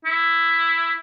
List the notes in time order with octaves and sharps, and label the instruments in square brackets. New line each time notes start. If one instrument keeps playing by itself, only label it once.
[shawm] E4